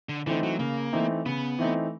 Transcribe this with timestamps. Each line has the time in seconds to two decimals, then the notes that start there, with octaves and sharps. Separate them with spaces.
0.09 D3
0.26 D3 E3 A3 C4 D#4
0.43 F#3
0.59 C#3 A#3
0.93 E3 A3 C4 D#4
1.25 C#3 B3
1.59 E3 A3 C4 D#4